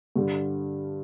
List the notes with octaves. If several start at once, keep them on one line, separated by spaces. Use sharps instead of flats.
G2 D3 G3